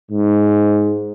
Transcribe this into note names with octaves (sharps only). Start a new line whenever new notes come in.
G#2